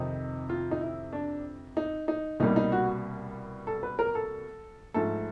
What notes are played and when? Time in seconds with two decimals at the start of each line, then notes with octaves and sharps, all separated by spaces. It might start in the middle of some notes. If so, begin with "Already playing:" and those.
Already playing: F2 C3 D#3 D#4
0.49 F4
0.71 D#4
0.81 E4
1.13 D4
1.77 D#4
2.08 D#4
2.40 C2 B2 G3 A#3 D#4
2.56 D#4
2.72 F#4
3.67 A4
3.83 B4
3.99 A#4
4.15 A4
4.94 G#2 F3 A3 A4